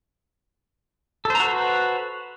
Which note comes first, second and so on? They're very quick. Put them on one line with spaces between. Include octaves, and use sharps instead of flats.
A4 C5 A#5 F#4 B4